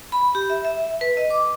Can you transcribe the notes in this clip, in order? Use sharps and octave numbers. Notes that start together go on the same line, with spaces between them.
B5
G4
E5
E5
B4
D#5
D6